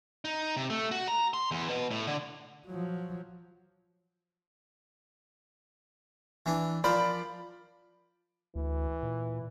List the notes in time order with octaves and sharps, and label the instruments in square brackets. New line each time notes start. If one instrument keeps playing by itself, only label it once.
[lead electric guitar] D#4
C3
A3
F#4
A#5
C6
E2
B2
A2
D3
[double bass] F3 F#3
[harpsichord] E3 D4
[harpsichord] F3 A#4 C5 [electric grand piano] D5 B5
[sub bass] D2 [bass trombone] E3
[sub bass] A#2